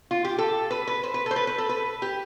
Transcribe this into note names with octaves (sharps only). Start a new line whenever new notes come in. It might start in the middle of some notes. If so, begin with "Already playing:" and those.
F4
G4
A4
B4
B4
C5
B4
A4
C5
B4
B4
A4
B4
G4